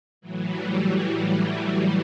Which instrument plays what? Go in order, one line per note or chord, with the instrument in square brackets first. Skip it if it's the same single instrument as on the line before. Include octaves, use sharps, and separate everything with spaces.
[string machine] A2 E3 F#3
G3
G3